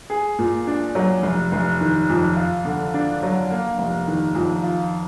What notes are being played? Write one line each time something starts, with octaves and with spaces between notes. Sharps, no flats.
G#4
A#2
D4
F#3
F1
F1
D#3
F2
F4
D3
D4
F#3
A#3
F1
D#3
F2
F4